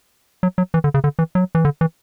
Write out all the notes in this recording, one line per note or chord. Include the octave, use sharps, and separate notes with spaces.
F#3
F#3
E3
D3
C#3
D3
E3
F#3
E3
D3
E3